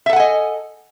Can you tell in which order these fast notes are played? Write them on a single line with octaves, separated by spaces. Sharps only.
E5 A4 F#5 G#5 D#5